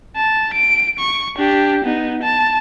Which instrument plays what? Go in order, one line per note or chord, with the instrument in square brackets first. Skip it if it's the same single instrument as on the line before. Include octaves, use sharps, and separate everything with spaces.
[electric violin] A5
D7
C#6
D4 G4
B3 D#4
A5